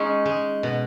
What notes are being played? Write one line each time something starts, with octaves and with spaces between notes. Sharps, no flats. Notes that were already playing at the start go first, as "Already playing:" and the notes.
Already playing: G#3 C#4 D#4
G#3
B2